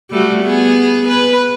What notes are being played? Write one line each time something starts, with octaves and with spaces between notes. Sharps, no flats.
G3 A3 F#4
B3 G#4
B4